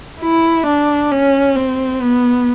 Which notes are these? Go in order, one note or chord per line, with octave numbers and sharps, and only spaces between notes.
E4
D4
C#4
C4
B3